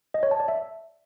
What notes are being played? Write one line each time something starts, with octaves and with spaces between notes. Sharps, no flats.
D#5
C#5
A5
D5
E5